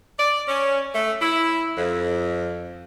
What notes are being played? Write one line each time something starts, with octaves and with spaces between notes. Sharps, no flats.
D5
C#4
A3
E4
F2